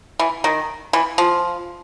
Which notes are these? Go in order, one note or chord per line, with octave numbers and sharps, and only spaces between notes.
E3
D#3
E3
F3